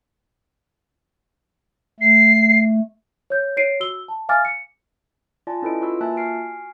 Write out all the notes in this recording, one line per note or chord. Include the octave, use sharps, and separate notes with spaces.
A3 C7
C#5 G6
C#5 C7 D7 D#7
F#4 E6 G7
A5
E5 F5 G#5 D6 F6 A6
C#7
F4 D5 G#5 A5
C#4 E4 A4 B4 D#5 D7
F4 F#4 B4 E6
A#3 F4 E5 G#5 A5 F#6
F#4 G#5 F6 C7 D7